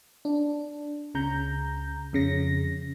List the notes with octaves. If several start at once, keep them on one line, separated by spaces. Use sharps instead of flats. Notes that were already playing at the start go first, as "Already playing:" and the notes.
D4
C#2 C#3 A#5 G6
F2 C#3 A#6